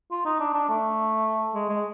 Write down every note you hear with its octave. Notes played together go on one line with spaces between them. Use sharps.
F4
D#4
D4
D4
A3
G#3
G#3